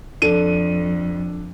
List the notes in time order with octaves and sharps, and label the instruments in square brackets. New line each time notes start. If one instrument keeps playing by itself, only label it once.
[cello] F2 [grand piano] D4 A4 D#7